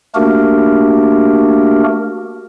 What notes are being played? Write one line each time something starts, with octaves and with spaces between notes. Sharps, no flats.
A3 A#3 D4 F#4 G4 A#4